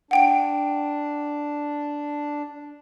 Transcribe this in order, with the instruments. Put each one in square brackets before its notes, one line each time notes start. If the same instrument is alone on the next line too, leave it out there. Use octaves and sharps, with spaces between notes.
[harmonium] D4 [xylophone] F#5 G5 D7